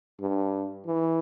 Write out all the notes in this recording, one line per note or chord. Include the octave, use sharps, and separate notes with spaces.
G2
E3